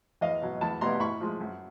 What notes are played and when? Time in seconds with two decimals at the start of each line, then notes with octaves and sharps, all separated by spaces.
0.21 E2 D#5 F5
0.42 B2 F#3
0.61 E2 A5 B5
0.81 B2 G3 B3 E4 A#5 C6
1.00 A2 B5 C#6
1.20 F3 G#3
1.40 F#2